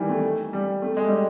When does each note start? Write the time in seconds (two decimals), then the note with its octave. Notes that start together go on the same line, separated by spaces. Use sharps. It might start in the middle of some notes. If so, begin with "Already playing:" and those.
Already playing: D#3 E3 G3
0.09 A3
0.53 G3
0.82 A3
0.97 G#3
1.07 G3